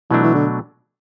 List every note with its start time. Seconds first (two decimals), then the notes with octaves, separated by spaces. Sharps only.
0.10 B2 E3 F#3 A3 D4
0.23 E3
0.35 D3